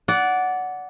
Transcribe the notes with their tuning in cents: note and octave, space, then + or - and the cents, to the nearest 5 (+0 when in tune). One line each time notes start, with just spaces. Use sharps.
D5 -20 F#5 +0